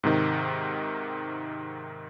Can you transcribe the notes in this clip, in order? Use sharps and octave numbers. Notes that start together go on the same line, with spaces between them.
G#2 C3 D#3